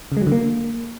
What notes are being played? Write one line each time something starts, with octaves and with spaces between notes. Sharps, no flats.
C#3
G#3
F#3
D3
A#3